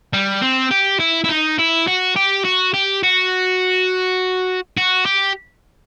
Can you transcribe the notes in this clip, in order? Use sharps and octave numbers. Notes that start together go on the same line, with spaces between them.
G3
C4
G4
E4
E4
D#4
E4
F#4
G4
F#4
G4
F#4
F#4
G4